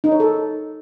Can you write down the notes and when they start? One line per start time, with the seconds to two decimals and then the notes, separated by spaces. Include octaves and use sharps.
0.04 D#4
0.12 C#5
0.20 A4